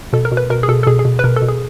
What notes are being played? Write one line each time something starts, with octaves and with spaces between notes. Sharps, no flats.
B2 A4
A#4
B2
B4
B2 A#4
G#4
B2 A4
A4
B2 G#4
G#4
B2
B4
B2 A#4
A4
B2
G#4